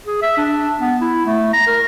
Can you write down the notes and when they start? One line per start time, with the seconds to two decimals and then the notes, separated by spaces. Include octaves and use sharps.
0.06 G#4
0.22 E5
0.37 D4
0.80 B3
1.01 E4
1.26 A3
1.53 A#5
1.67 A#4